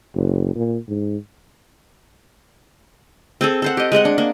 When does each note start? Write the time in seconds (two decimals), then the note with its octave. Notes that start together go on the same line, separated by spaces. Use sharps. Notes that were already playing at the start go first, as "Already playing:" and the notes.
0.14 F#1
0.55 A#2
0.88 G#2
3.41 C4 G#4 A4
3.62 A4 C5 F#5
3.77 G4 D#5
3.92 G#3 G#4 D#5 F#5
4.05 D4
4.18 A#3